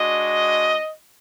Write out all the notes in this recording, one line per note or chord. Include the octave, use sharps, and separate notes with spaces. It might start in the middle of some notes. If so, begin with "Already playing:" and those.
Already playing: G#3 D4 F#4 D#5